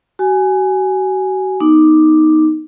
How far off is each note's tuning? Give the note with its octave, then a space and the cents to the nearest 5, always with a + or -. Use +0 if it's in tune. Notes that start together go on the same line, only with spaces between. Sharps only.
F#4 +35 G#5 +0
B3 -30 D#4 +0 D6 +5